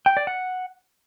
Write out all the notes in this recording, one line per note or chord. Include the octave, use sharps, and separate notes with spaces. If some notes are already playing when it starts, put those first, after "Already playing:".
G5
D5
F#5